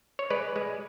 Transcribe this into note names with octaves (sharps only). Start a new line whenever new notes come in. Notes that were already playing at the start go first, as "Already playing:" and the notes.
C#5
G#3 B4 D5
G#3